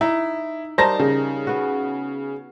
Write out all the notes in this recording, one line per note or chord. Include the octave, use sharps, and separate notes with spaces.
D#4 E4
G3 D#4 A#4 C5 A5 A#6
C#3
B3 F#4